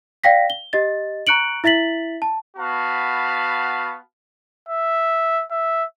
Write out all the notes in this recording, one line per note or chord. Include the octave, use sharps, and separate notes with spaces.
D5 F5 G5 A#6 B6
G7
G4 D#5 A6
A#5 C#6 F#6 C#7 D7 F#7
E4 E5 A6 B6 F#7
A5
B3 F#4 F5 A5 B5
E5
E5